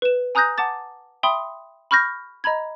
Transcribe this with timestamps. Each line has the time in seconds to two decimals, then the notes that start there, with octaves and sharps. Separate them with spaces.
0.02 B4 E7
0.35 G#5 A#5 D#6 F#6 G6 A#6
0.58 F#5 A5 D6 A6
1.23 E5 G5 B5 C6 D#6
1.91 B5 C#6 F6 G6 A#6
2.44 D#5 A#5 B5 G#6